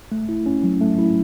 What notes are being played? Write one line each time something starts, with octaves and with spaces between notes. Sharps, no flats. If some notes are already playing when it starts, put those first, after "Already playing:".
A3
E4
C#4
F#3
A3
E4